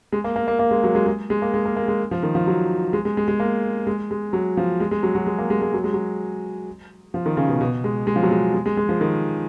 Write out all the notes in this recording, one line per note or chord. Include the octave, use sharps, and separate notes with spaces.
G#3
A#3
A#3
A#3
A#3
G#3
F#3
G#3
G#3
G#3
A#3
G#3
A#3
A#3
G#3
F3
D#3
F3
F#3
G#3
G#3
G#3
G#3
A#3
G#3
G#3
F#3
F3
G#3
G#3
F#3
F#3
G#3
A#3
G#3
G#3
F#3
G#3
F#3
F3
D#3
C#3
B2
B2
G#3
G#3
F3
F#3
G#3
G#3
G#3
G#3
F3
D#3